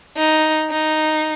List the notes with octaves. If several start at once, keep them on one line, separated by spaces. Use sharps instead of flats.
D#4
D#4